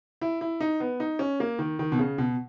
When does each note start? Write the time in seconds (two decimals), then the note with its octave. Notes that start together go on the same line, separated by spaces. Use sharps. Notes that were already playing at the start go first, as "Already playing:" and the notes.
0.21 E4
0.41 E4
0.61 D#4
0.80 B3
1.00 D#4
1.19 C#4
1.40 A#3
1.59 D#3
1.79 D#3
1.92 B2
1.99 C#3
2.18 B2